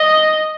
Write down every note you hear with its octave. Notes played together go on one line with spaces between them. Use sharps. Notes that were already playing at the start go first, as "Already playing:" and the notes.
Already playing: D#5